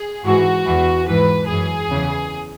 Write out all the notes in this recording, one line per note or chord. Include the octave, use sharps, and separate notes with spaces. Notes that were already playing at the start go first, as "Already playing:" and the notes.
Already playing: G#4
G#2 E3 F#4
E2 E3
G#2 E3 B4
F#2 E3 G#4
E2 C#3 E3